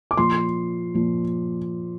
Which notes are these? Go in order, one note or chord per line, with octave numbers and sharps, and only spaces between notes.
D6
A#2 F3 C6
A#2 F3